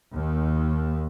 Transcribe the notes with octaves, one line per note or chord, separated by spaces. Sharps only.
D#2